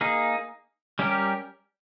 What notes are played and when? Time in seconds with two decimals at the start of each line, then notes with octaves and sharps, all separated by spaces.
0.01 A#3 D#4 G#4
0.99 G3 C#4 G4 A#4